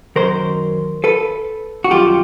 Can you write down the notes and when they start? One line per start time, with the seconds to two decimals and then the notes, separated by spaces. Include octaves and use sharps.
0.16 F#2 D#3 F#3 A#4 C5
1.04 A4 B4
1.84 F#4
1.91 F#2 D#3 G3 F4 G4